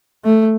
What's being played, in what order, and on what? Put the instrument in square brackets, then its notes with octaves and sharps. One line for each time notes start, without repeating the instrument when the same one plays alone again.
[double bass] A3